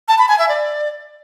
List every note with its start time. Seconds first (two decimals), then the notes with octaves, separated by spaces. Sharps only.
0.08 A5
0.18 B5
0.29 G#5
0.39 E5
0.49 D5